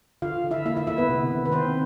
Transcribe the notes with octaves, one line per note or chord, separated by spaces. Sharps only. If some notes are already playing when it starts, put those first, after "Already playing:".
D3 F4 F5
D3
E4 E5
A#3 E4 E5
E4 E5
D3 E4 E5
B3 B4
C3
D#3
B4
D#3 C4 C5